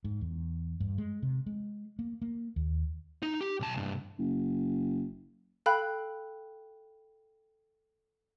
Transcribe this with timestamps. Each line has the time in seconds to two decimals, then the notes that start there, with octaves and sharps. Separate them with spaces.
0.04 G#2
0.21 E2
0.80 G2
0.98 G#3
1.23 C3
1.46 G#3
1.99 A#3
2.22 A#3
2.56 D#2
3.23 D#4
3.41 G4
3.60 B1 A5
3.77 C2 G2
4.19 F#1
5.66 A4 F5 G5 B5 F#6